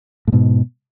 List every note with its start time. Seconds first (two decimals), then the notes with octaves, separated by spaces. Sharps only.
0.28 A2
0.32 G#2 B2